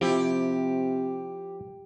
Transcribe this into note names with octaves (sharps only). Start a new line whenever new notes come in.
C3 F3 E4 G4